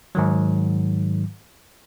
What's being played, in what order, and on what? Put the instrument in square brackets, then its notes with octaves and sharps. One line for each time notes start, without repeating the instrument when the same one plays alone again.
[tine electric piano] G#2 D#3 F#3